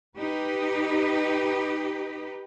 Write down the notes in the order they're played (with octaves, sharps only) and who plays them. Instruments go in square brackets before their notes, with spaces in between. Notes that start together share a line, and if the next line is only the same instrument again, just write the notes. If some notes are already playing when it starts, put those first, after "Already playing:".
[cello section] D#4 G4 B4